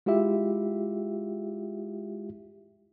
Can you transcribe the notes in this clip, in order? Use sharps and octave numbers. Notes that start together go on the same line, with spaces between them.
G#3 E4 F4 G4 E5